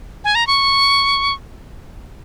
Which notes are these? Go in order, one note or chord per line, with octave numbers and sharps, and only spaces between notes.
G#5
A#5
C#6